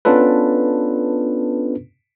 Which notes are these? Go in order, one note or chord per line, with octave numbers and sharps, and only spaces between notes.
B3 C#4 D4 F4 A4 B4